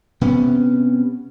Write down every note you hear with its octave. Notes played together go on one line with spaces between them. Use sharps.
C3 B3 C#4